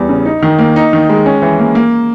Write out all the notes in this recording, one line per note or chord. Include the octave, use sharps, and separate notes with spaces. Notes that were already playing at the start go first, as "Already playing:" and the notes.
Already playing: E2 G3
C#3
D#4
D#3
A#3
D#4
D#3
G#3
C#4
E3
A#3
A#3